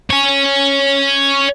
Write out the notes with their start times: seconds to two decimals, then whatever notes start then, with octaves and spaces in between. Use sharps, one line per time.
0.10 C#5 G#5